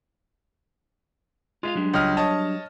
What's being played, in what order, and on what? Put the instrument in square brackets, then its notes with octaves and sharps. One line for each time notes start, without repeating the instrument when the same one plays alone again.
[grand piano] G#3 [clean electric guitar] F4 E5 F5
[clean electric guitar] F#3 G3 D4
[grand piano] C#2 D#5 F6
C#5 D#5 A5